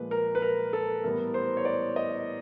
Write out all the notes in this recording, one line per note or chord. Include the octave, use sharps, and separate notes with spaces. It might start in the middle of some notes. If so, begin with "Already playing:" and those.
Already playing: A#2 F3 G#3 B4
A#4
B4
A#4
A4
A2 E3 G3 B3 A#4
C5
C#5
D5
D#5